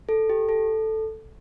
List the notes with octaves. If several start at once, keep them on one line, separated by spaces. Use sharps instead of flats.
A4
G4
A4